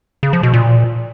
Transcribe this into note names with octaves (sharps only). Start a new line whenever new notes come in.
C#3
F3
B2
A#2